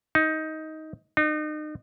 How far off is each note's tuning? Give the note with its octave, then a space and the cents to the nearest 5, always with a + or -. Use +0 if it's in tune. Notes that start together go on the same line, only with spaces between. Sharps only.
D#4 +15
D#4 -35